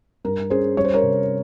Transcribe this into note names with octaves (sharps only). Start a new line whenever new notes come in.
G2 A#4
C#4 G#4 C5
G3 C#5
C5
A#4 C#5
C3